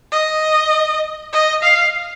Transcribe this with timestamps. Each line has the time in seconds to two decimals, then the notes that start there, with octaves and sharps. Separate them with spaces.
0.11 D#5
1.33 D#5
1.63 F5